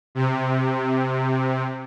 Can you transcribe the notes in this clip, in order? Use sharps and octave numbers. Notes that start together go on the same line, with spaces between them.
C3